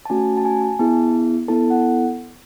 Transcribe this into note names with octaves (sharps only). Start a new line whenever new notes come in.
A5
A3 C#4 F#4 G#5
A5
G#5
G#5
B3 E4 G#4 A5
B3 E4 A4 A5
F#5